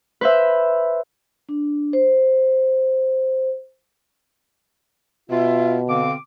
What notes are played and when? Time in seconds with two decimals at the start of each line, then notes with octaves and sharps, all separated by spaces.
0.21 B4 C5 E5
1.49 D4
1.93 C5
5.31 B2 F4 E5
5.89 D3 C4 F5 D6